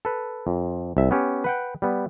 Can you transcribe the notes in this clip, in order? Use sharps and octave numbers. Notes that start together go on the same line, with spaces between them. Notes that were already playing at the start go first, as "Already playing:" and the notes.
A4 B4
F2
C2 E5
B3 C#4 G4
B4 F#5 G5
G3 B3